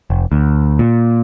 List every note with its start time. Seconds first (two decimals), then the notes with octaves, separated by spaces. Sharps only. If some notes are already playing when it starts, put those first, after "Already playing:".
0.10 F1
0.32 D2
0.79 A#2